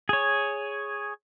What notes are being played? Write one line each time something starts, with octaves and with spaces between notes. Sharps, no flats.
G#4 C#5